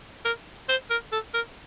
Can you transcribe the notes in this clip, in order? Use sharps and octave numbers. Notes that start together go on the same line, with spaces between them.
A#4
C5
A#4
A4
A#4